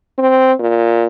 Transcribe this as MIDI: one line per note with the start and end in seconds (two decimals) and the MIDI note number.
0.18 0.53 60
0.59 1.07 46